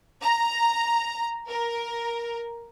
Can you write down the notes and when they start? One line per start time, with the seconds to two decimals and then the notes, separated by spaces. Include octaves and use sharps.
0.22 A#5
1.47 A#4